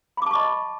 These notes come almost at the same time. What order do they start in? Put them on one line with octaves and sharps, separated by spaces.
B5 D6 A5 C#6 D#5